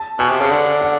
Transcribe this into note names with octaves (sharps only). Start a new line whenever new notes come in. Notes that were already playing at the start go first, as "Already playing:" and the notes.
Already playing: A5
B2 G#5
C3
C#3
D3
F#5